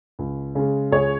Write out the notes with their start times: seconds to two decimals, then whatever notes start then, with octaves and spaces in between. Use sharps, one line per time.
0.19 C#2
0.55 C#3 G#3
0.92 C#2 G#4 C#5